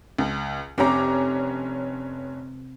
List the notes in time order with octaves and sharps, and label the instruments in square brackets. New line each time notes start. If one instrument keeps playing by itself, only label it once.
[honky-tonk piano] C#2
[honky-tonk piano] F1 C#4 A#5 [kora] C3 G4